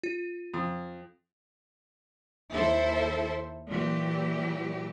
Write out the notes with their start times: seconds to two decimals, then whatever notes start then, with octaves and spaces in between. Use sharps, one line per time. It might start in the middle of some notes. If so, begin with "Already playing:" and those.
0.03 F4
0.54 F2
2.53 D#2 E4 A4 C5 E5
3.68 A#2 E3 F#3 G4